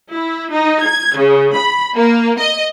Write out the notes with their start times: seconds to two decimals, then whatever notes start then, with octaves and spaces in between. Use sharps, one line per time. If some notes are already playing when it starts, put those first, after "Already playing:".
0.12 E4
0.51 D#4
0.86 G#6
1.18 C#3
1.55 B5
1.97 A#3
2.39 D#5